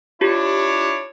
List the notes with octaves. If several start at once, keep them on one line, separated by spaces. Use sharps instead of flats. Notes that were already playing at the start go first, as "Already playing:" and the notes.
D4 E4 F4 G4 C#5